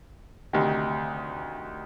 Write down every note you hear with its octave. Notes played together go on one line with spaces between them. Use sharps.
D2 C3 D#3